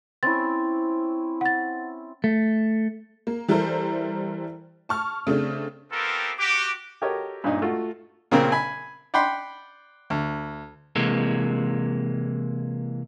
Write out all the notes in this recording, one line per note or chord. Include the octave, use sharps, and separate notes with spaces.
C4 C#4 E4 A6
F#5 A6
A3
A#3
E3 G3 E4 A4 A#4 C5
A5 C#6 F6
C#3 A3 C4 D4
B3 C4 F4 G4 A4 A#4
F#4 G4 D6
F#4 G4 A4 A#4 C#5 D#5
G2 A#2 C#4 D#4
A3 F4 F#4
A#2 C#3 A#3 C4 A#4
G#5 B5
D5 F#5 G5 B5 C6
D2
C3 E3 G#3 A#3